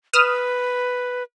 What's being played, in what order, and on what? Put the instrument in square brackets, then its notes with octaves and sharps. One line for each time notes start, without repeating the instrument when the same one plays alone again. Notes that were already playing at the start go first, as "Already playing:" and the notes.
[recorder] B4 [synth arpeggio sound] D#6 F6 E7